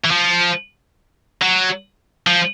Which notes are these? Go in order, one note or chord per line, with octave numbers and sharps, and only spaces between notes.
E3
F3
F#3
F3